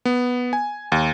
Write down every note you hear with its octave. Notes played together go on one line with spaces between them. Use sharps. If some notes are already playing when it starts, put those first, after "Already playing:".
B3
G#5
D#2